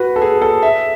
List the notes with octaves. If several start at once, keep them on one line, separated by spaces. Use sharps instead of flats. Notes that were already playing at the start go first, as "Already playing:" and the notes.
Already playing: F#4 B4
A4
G#4
A4
E5